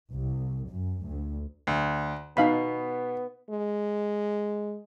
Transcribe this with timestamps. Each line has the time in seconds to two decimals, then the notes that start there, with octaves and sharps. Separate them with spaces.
0.14 C2
0.70 F#2
1.07 D2
1.67 D2
2.37 B2 B3 D#4 F5 B5
3.50 G#3